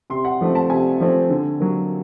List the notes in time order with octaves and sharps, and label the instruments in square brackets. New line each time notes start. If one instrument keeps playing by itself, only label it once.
[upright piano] C3 C6
F#5
F3 A3 C4
A5
C3 G#5
F3 A3 C4
D3
F#3 A#3